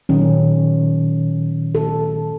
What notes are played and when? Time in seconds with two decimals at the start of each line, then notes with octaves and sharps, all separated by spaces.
0.09 A#2 D#3 F#3 C#4
1.75 A4